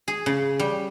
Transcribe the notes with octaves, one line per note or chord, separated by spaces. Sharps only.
G#4
C#3
G3